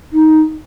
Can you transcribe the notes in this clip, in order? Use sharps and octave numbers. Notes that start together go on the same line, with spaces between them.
D#4